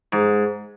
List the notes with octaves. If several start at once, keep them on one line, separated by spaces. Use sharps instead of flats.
G#2